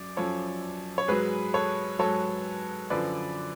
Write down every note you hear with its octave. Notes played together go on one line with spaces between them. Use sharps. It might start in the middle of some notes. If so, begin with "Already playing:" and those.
Already playing: F#2 D5
F#2 F3 A4 C#5
C#5
G#2 F#3 G#4 B4
A4 C#5
G#2 F#3 A4 C#5
F#2 D3 F3 B4 D5